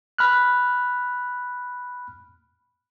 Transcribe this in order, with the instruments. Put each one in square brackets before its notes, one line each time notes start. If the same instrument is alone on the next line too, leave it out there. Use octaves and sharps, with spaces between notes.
[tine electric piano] B5 F6 F#6